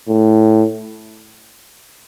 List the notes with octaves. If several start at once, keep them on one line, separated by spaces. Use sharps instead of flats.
A2